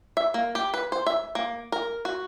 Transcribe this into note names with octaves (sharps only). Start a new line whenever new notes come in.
E5
A#3
G4
B4
C5
E5
A#3
A#4
F#4